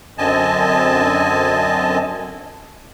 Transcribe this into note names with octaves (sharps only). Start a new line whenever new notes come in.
F#2 D3 C4 D#5 G#5 A5